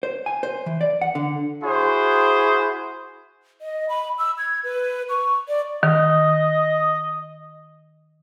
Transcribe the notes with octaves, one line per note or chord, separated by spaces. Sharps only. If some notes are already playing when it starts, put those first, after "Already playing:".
C5
G#5
C5
E3
D5
F#5
D3
E4 F#4 G#4 C5
D#5
B5
E6
G#6
B4
C#6
D5
D#3 D#5